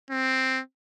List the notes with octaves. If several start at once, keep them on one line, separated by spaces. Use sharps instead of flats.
C4